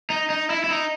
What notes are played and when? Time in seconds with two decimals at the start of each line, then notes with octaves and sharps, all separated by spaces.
0.10 D#4
0.30 D#4
0.50 E4
0.64 E4
0.70 D#4